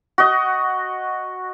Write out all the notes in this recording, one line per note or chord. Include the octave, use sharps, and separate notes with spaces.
F#4 D#5